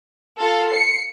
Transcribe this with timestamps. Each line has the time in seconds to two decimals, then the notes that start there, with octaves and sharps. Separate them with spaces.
0.40 F4 A4 F5
0.71 C7 C#7